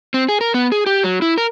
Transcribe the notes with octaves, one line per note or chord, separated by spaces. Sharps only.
C4
G#4
A#4
B3
G#4
G4
F#3
E4
A#4